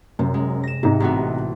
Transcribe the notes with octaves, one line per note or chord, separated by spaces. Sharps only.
F#2 C3
G#3
A#6 E7
G#2 C3 D#4
A1 B3 F#4